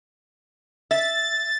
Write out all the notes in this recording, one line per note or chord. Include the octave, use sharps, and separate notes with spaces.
E5 A6